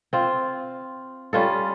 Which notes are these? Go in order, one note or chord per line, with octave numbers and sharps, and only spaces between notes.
C4 F4
G3 C#4 F4 A4